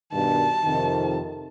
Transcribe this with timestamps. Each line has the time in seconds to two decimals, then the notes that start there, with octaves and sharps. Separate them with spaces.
0.12 G2 B2 D#3 A5
0.65 F2 C3 D#3